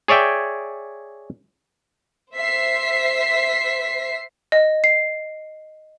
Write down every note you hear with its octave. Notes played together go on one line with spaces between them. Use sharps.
G#4 C#5 D5 E5 G5
C5 E5 B6 C7
D#5
C7